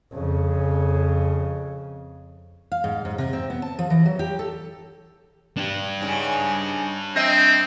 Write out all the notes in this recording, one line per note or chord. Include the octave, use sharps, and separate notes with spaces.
F2 C#3
F5
G#2
G#2
C3
C4
B3
A5
F3
E3
F#3
G4
A4
D4 G4
G#2 C#3
C4 D#5 E5